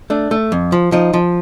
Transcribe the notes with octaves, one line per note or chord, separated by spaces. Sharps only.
A3 D4
A3
F2
F3
F3 D#4
F3